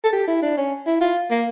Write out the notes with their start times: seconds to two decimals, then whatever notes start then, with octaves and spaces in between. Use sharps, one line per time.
0.04 A4
0.13 G4
0.28 E4
0.42 D4
0.57 C#4
0.87 E4
1.01 F4
1.30 A#3